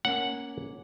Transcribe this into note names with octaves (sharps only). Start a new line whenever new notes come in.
A#3 C#4 F#5